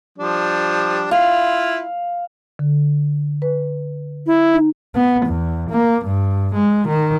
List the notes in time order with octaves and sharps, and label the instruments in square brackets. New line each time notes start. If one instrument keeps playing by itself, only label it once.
[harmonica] F3 G3 D4
[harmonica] E4 F4 [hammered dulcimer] F5
[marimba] D3
B4
[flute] E4
[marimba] D#4
[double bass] B3
E2
A#3
G2
G#3
D#3